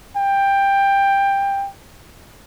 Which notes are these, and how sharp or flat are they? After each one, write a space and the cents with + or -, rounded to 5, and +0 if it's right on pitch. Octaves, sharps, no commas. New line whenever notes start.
G5 +15